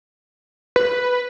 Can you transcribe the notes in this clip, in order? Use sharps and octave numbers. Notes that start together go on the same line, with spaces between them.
B4